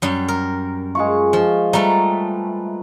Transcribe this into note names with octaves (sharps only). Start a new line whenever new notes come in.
F#2 G3
A#4
G#3 F4 C#6
F3
G3 A3 B4 A#5